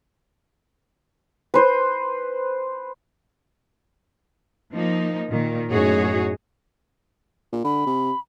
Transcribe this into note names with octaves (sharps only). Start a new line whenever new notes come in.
B4 C5
F3 A#3 D#4
A#2 D#3
F#2 A2 D#4 F#4 G#4 C#5
A#2
D3 B5
C3